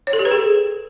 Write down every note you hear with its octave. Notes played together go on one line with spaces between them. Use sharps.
C#5
A4
G4
B4
G#4